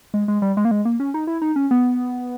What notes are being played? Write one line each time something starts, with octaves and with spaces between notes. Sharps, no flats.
G#3
G#3
G3
G#3
A#3
G#3
A#3
C#4
D#4
E4
D#4
C#4
B3